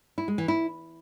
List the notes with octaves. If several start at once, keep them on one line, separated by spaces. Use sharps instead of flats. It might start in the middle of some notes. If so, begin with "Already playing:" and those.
E4
G#3
E3
E4